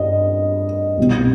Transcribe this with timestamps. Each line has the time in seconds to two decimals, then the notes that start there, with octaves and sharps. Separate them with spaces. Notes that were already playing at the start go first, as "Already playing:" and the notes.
Already playing: G2 D#5
0.98 C2 B2 G3